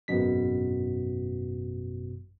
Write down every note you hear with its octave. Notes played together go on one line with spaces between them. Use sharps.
G#1 F#2 B2 B6